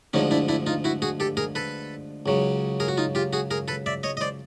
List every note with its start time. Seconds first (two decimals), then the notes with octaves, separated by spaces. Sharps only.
0.13 D2 D3 F3 G#3 C#4 D#4
0.31 D4 E4
0.48 D4 E4
0.67 D#4 F4
0.84 E4 F#4
1.02 F#4 G#4
1.20 G4 A4
1.37 G#4 A#4
1.55 A4 B4
2.26 C#2 C#3 F#3
2.80 G#4 A#4
2.88 F#4
2.97 D#4 F4
3.15 F4 G4
3.33 F#4 G#4
3.51 G#4 A#4
3.68 A4 B4
3.86 D5 E5
4.03 C#5 D#5
4.17 D#5
4.21 C5 D5